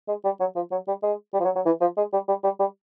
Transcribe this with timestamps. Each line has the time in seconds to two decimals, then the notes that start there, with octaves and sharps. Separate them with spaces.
0.08 G#3
0.25 G3
0.40 F#3
0.56 F3
0.72 F#3
0.88 G3
1.03 G#3
1.34 G3
1.40 F3
1.45 F#3
1.56 F#3
1.66 E3
1.81 F3
1.97 G#3
2.13 G3
2.28 G3
2.44 G3
2.60 G3